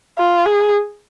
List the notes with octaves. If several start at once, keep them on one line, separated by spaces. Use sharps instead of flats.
F4
G#4